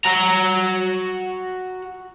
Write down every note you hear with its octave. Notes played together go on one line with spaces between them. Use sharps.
F#4 A#5